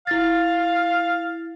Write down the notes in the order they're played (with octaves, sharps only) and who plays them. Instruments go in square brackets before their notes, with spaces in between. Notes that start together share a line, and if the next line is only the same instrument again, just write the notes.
[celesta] E4 A6 [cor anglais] F5